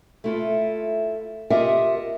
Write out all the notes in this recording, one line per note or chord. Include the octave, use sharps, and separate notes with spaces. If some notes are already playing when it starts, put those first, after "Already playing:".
A3 E4 F4
F4 G4 A#4 D#5 E5 F#5